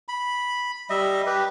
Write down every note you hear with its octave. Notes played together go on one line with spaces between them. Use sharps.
B5
G3 D#5 E5
G4 B4